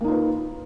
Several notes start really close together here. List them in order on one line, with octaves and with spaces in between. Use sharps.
A#3 D#4 F4 B4